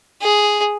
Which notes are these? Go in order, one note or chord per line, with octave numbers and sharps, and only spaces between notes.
G#4